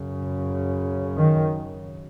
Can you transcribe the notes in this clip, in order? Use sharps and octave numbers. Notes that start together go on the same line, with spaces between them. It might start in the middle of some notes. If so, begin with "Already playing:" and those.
Already playing: F#2 C#3
D#3